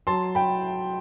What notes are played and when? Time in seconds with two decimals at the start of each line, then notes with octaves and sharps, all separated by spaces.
0.07 F#3 A5 C6
0.35 G5 B5